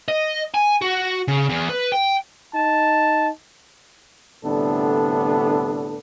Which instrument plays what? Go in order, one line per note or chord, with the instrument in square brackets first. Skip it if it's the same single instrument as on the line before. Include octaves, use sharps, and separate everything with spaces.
[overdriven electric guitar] D#5
G#5
F#4
C#3
E2
B4
G5
[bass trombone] D#4 [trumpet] A5
[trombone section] C2 A2 D3 B3 D4 A4